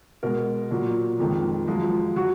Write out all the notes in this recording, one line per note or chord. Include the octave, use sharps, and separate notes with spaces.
B2 G#3 A#4
A#2 F#3
F2 D#3 G#3
F#2 F3 G#3
F#3 F#4